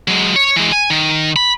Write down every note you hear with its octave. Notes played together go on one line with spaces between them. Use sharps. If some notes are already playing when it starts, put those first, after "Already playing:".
F#3 G#3
C#5
E3 G#3
G#5
D#3
B5